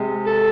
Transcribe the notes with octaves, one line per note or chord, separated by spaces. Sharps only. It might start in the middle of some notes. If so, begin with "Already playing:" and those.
Already playing: C3 G#3
A4